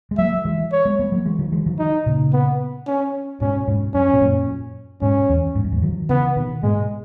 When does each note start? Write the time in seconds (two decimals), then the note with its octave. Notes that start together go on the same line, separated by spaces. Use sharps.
0.11 G#3
0.18 F#3 A#3 E5
0.45 E3 G#3
0.72 C#5
0.85 G#3 B3
0.99 G#3 B3
1.12 F#3 A#3
1.25 E3 G#3
1.39 D#3 F#3
1.52 E3 G#3
1.66 D#3 F#3
1.79 D#4
2.06 A#2 C#3
2.33 B3
2.87 C#4
3.41 G#2 B2 C#4
3.68 G#2 B2
3.94 F#2 C#4
4.13 B2
4.21 F#2 A#2
5.02 G#2 B2 C#4
5.29 E2
5.55 G#2
5.64 F#2
5.72 E2 G#2
5.82 D#3 F#3
6.09 C#3 E3 B3
6.36 B2 D#3
6.63 G#2 B2 G#3